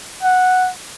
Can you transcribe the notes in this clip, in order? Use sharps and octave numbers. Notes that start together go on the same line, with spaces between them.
F#5